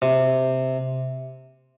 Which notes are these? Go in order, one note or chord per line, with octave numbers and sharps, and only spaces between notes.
C3